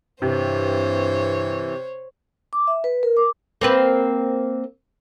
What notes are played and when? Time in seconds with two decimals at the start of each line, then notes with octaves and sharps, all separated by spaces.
0.22 G2 C3 E3 C5 C#5
2.53 D6
2.67 E5
2.84 B4
3.03 A#4
3.17 D6
3.61 A#3 C4 B4